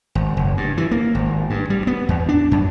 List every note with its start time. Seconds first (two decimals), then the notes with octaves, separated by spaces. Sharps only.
0.15 G#1
0.37 F#1
0.57 G2
0.77 E3
0.91 A#3
1.15 G#1
1.50 G2
1.70 G3
1.87 B3
2.09 E2
2.29 D4
2.51 F#2